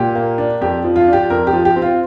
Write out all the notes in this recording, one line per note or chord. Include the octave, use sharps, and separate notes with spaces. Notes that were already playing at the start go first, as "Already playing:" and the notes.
Already playing: A#2 G4
A#3
D4
F2 G4
F3
F4
D4
G4
F2 A#4
G4
F3
G4
C4
F4